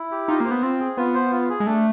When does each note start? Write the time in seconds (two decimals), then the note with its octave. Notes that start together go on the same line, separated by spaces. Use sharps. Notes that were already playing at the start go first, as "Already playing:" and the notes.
Already playing: E4
0.11 G4
0.28 D#4 F4
0.40 A#3 C5
0.51 B3
0.63 C4 F4
0.80 G#4
0.97 B3 F4
1.14 C5
1.32 F4
1.49 G#4
1.60 G#3
1.67 A3 D4